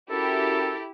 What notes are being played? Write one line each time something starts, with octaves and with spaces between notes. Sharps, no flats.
C#4 E4 F#4 G4 A4 A#4